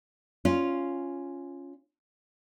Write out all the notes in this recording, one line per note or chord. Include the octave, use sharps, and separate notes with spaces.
C#4 F4